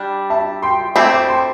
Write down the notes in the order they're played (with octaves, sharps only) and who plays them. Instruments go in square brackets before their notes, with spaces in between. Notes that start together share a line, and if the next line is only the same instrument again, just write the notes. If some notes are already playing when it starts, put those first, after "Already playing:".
Already playing: [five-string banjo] G3 D4
[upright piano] E5 A5
G5 C6
[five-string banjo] A3 C4 E4 [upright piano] A5 D6
[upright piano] A5 D6
G5 C6